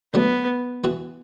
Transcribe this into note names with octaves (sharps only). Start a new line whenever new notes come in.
D3 F#3 A3 B3
E3 B3 F#4